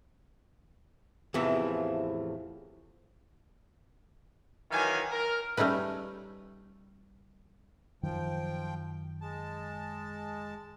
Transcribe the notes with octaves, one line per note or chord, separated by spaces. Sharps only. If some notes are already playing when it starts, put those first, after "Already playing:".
E2 A2 C3 E3 F3
D#3 E3 F#3 F5 G#5
A#4
G3 A3 C#4 D#4 B4
F#2 D#3 F3 F#3 G5
G#3 A5